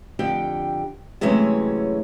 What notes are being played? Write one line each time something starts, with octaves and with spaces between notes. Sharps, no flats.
F2 D3 G4 G5
C3 E3 F#3 G#3 A3 C#4